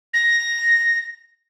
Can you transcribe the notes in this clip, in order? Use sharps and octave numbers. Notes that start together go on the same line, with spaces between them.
A#6